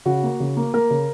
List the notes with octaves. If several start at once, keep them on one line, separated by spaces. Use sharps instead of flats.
C#3 F#4
A#3
C#3
A#3
A#3 A#4
C#3